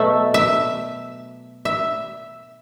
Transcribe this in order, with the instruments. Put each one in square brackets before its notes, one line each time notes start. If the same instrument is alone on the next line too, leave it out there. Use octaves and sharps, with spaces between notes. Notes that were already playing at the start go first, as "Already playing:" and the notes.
Already playing: [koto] B2 F#3 A3 E5
E5
E5